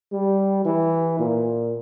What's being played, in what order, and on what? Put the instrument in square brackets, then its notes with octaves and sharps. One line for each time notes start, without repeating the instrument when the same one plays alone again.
[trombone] G3
E3
A#2